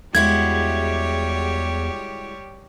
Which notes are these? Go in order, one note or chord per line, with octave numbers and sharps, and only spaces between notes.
E2 G3 G#3 E4 F#4 G4 C#5 G#6